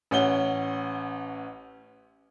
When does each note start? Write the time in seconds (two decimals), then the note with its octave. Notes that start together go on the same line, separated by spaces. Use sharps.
0.11 A1 C#4 F#5 G7